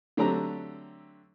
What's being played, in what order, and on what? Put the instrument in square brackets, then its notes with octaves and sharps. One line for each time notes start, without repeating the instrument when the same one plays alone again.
[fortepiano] D3 F#3 A3 C4 G4 A#5